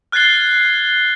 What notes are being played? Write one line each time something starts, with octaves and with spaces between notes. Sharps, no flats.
F6 F#6 G#6 A6 C7 G7